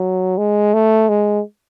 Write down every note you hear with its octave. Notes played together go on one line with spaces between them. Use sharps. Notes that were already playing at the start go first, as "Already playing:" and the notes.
Already playing: F#3
G#3
A3
G#3